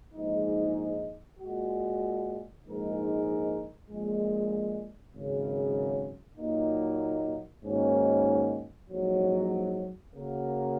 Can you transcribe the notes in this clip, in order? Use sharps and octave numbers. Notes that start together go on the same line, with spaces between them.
A#1 G#2 G#3 D#4
A#2 G#3 F#4
A#1 G#2 G#3 D#4 A#4
A#1 A#2 G#3
G#1 F#2 C#3
A#2 F#3 A#3 D#4
G#2 D#3 A#3 C#4 F#4
A#1 G#2 F#3
C#3 A#3 F#4 A#4